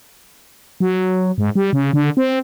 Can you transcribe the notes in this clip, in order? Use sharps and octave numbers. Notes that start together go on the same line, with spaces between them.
F#3
G#2
G3
C#3
D3
C4